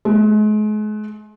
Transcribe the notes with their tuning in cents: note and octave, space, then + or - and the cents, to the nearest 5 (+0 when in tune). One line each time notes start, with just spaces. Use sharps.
G#3 +40